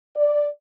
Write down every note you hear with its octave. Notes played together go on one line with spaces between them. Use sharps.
D5